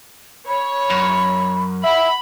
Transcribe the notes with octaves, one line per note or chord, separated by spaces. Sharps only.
C#5 B5
F#2
E5 F#5 B5